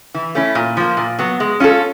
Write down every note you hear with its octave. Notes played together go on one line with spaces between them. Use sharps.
E3
A3 C#4 E4
A#2
F3 A#3
A#2
F#3 B3
G#3
C#4 F4 A4